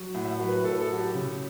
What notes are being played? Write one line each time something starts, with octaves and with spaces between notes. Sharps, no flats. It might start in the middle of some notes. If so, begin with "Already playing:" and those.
Already playing: F#3
A2 F#5
E5
F#5
F#3
B4
A2 A4
A4
F#3 F#4
G4
C#3